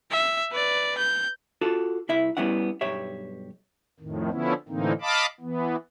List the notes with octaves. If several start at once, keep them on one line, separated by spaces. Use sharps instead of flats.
E5
B4 D5
G6
F4 F#4 A4
C2 E4 E5
G3 B3 C#4 E4 F#5
B1 G2 G4 C#5 E5
F2 A2 D#3
D3 F3 B3 C#4 E4
A2 D3 E3 A#3 C4 D#4
D#5 F5 A5 B5 D6
E3 B3